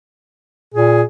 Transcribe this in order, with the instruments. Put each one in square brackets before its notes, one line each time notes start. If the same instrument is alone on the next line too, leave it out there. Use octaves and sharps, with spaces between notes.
[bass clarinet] A#2 [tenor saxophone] G#4